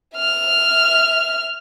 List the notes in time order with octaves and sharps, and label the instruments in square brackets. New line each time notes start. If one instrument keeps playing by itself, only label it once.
[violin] E5 F6